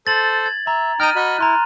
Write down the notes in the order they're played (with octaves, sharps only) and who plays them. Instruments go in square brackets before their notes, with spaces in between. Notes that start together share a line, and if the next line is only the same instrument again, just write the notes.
[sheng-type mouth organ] A4 C5 [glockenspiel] A6 F#7
[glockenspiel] G#6
[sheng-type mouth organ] E5 [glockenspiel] A#5 G#6
[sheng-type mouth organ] D#4 G5 A#5 [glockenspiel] F6 D#7
[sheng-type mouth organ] F#4 D#5 B5
[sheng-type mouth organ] E4 [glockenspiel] A#5 C6 F#6